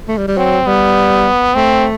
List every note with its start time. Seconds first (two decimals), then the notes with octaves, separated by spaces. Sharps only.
0.08 A3
0.17 G3
0.28 G3
0.37 F#3 C4
0.67 G3 B3
1.55 A3 C4